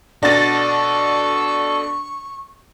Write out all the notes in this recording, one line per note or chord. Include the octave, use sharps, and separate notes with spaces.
B2 D4 A4 F#5 C#6 A6 A#6